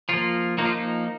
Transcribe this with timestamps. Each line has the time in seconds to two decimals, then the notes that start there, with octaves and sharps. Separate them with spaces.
0.09 F3 A#3 F4
0.58 F3 A#3 D#4
0.65 F4
0.72 D#4